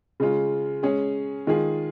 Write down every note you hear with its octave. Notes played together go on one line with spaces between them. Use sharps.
C#3 G#3 F4
G#3 C#4 G#4
D#3 G#3 F4 G#4